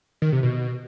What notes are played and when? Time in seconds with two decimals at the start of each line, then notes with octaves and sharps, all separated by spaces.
0.22 D#3
0.32 C3
0.43 B2